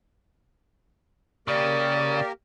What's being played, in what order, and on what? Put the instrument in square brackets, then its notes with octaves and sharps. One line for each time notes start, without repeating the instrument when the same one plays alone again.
[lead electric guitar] C#3 [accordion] A#3 G4 A#4 [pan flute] D5